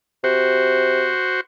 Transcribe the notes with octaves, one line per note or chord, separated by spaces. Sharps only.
C3 F#4 C5